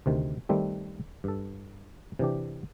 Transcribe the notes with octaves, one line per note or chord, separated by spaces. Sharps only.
D2 C3 D#3
D#3 G3 A3 C4
G2 A4
C3 E3 D4 G4